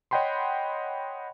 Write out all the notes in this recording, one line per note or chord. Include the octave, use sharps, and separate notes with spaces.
C#5 D#5 F#5 G5 B5 C6